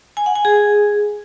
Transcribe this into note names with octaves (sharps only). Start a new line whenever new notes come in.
G#5
F#5
G#5
G#4